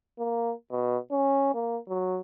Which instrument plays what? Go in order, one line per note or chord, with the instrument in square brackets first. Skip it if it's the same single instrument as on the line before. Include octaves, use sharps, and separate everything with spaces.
[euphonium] A#3
B2
C#4
A#3
F#3